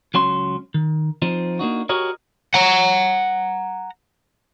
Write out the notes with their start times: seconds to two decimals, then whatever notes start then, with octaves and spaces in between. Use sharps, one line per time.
0.14 C#2 F#3 C#4 C6
0.74 D#3
1.22 F3 C4 D#4
1.59 A#3 D4 D#4 F#4
1.89 F#4 G4 A#4 C#5 D#5
2.54 F#5 A#5